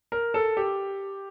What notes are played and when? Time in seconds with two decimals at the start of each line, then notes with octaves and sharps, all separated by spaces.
0.12 A#4
0.34 A4
0.57 G4